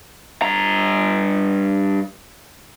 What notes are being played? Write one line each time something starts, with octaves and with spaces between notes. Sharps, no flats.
G2 A#5